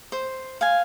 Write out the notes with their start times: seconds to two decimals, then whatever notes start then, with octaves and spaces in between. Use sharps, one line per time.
0.12 C5
0.61 F5 G#5